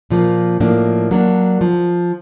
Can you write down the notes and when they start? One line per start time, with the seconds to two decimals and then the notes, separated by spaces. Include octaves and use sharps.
0.10 A#2 F3 A#3
0.60 A2 F3 A#3 D4
1.11 F#3 A#3 D4
1.61 F3